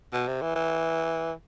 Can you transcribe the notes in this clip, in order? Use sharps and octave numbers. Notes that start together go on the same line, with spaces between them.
B2
C3
E3
E3